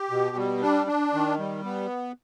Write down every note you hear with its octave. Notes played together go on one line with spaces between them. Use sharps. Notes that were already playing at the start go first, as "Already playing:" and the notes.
Already playing: G4
B2
G3
D4
D4
D#3
G3
B3